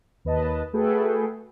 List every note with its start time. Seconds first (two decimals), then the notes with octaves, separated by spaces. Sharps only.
0.25 D#2 B4 D#5 A5
0.73 A3 F#4 G#4 A4 B4 G5